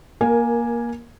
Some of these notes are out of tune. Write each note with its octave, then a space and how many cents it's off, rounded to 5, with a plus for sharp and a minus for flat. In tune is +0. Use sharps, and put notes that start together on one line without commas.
A#3 +20 A#4 +0 G#5 +0